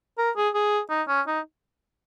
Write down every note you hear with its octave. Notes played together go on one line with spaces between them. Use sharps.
A#4
G#4
G#4
D#4
C#4
D#4